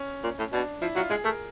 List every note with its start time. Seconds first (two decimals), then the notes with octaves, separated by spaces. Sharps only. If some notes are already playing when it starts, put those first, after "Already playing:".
Already playing: C#4
0.24 A#2
0.39 A2
0.53 B2 D4
0.82 F3 E4
0.96 F#3 F4
1.10 G#3 G#4
1.24 A3 A#4